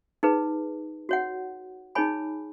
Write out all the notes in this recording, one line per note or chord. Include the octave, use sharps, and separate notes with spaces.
D#4 G#4 B4
F#4 C#5 F#5
D#4 G#4 C#5 G#5 B5